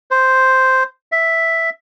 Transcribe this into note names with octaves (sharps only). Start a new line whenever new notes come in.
C5
E5